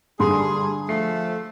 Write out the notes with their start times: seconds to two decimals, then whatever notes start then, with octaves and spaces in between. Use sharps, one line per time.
0.19 G2 D3 G#4 C6
0.89 F3 A3 C7